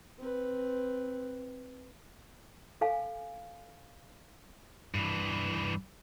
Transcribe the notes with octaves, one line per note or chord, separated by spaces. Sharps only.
C4 B4
A4 F5 G#5
G2 E3